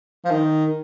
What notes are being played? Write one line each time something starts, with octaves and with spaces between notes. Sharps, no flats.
F3
D#3